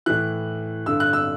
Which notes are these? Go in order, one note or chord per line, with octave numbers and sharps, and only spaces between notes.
A2 E3 F#6
G2 D3 E6
F#6
E6